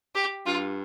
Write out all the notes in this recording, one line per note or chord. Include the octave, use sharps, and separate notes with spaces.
G4
G2 F4